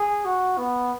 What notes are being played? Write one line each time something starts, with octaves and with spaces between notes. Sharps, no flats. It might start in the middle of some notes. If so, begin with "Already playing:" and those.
Already playing: G#4
F#4
B3